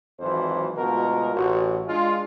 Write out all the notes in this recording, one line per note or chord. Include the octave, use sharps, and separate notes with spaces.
G#1 F2 E3 F#3 C5
D2 B2 G#3 F4 F#4 A#4
A1 F#4
G#3 D4 F4